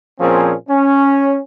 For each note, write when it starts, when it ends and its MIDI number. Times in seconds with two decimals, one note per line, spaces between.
0.20 0.54 46
0.20 0.54 53
0.20 0.54 58
0.20 0.54 60
0.20 0.54 61
0.20 0.54 68
0.69 1.37 61